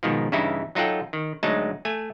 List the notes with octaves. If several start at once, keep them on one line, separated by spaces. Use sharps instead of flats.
G#2 B2 D#3 F3
G2 C#3 E3 D#4 E4
F#3 D#4 F4 A4 F#5 G5
D#3
D2 F#3 G#3 D#4 A5
A3 G#5